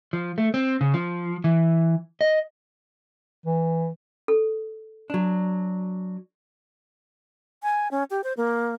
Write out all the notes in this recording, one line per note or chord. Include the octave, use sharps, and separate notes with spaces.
F3
A3
C4
C#3
F3
E3
D#5
E3
A4
F#3 D4
G#5
C#4
G4
C5
A#3